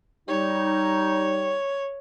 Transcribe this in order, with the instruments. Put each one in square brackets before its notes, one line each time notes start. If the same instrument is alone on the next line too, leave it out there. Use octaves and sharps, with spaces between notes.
[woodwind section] G3 D#4 [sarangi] C#5